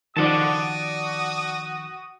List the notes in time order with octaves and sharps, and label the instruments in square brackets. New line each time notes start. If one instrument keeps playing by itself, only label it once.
[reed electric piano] D#3 F3 [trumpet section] F#4 D#6 [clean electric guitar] D5 F#5 A5